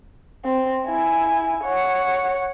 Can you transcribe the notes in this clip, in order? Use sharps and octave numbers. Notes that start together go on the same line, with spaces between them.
C4
E4 G#5
C#5 F#5